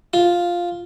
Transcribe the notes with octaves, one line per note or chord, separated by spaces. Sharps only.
F4